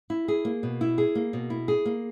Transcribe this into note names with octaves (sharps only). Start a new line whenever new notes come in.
E4
G#4
A#3
B2
E4
G#4
A#3
B2
E4
G#4
A#3